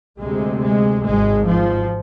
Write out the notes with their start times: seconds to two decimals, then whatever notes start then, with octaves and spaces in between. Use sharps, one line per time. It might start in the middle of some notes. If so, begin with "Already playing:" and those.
0.20 D2 C3 G#3
0.62 G#3
1.05 G#1 G#2 G#3
1.47 F3